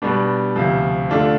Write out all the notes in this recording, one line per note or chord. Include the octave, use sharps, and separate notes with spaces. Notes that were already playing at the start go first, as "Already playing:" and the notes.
B2 G3 B3 D4
D2 C3 F3
D3 A3 D4 F4